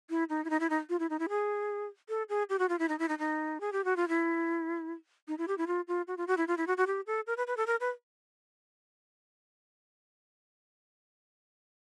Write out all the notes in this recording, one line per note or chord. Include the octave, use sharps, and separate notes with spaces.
E4
D#4
E4
D#4
E4
D#4
F4
E4
D#4
E4
G#4
A4
G#4
G4
F#4
F4
E4
D#4
E4
D#4
D#4
G#4
G4
F#4
F4
E4
D#4
E4
G4
E4
F4
F4
F#4
F4
F#4
E4
F4
E4
F#4
F#4
G4
A4
A#4
B4
B4
A4
A#4
B4